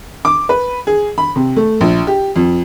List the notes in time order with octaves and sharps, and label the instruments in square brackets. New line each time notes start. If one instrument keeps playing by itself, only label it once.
[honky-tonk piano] D6
B4
G#4
B5
C3
A3
A#1
G4
F2